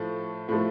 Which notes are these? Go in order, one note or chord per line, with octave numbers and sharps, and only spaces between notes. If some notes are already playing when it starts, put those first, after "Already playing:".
Already playing: A2 F3 A3
A2 F3 A3